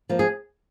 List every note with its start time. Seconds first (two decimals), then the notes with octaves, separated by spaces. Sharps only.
0.09 F3 A#3
0.19 G#4